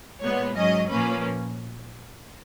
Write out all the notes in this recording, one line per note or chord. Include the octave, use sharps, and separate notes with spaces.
A#2 G#3 B3 C#5
G#2 F#3 C#4 D#5
A#2 F3 A#3 C#4 B4